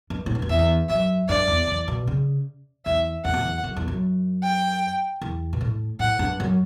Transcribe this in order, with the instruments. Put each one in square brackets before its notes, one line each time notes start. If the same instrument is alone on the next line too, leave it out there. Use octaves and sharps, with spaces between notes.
[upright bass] G2
A2
G2
F#2
[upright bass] E2 [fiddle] E5
[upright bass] F#2 [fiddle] E5
[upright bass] G2 [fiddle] D5
[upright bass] E2
E2
B2
C#3
[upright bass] E2 [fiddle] E5
[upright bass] E2 [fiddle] F#5
[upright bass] F#2
E2
F#2
E2
F#2
[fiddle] G5
[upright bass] E2
B2
A2
[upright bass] A2 [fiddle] F#5
[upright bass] G2
F#2